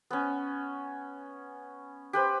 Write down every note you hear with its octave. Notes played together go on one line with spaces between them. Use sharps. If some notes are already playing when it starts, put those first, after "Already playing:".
B3 C#4
G4 B4 C5